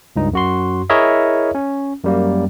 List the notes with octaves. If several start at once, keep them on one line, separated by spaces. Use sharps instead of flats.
C#2 G2 D#4
F#2 F#4 C6
E4 G#4 A#4 C#5 D#5 E5
C#4
F#2 G3 A#3